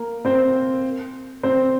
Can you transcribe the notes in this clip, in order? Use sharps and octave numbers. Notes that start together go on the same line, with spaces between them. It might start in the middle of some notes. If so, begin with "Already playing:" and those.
Already playing: A#3 A#4
C4 C5
C4 C5